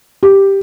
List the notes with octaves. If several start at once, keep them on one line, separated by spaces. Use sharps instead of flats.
G4